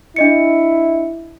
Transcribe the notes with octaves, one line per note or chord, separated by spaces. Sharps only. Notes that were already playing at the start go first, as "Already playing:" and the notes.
D4 E4 D#5 C#7